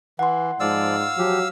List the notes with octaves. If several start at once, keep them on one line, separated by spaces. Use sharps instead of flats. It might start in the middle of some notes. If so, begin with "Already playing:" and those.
E3 F#5 C6
G#2 F3 D5 F5 E6
F3 F#3 G4